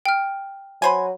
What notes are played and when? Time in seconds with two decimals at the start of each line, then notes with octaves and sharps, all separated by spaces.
0.06 G5 F6
0.82 F#3 B4 C5 G#5